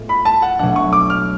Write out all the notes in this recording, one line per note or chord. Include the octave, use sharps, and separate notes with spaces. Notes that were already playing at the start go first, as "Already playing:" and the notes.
Already playing: A2 G#3 B3 F4
B5
A5
F#5
B1 B2 F#3 A3 D4 F#5
C#6
D6
F6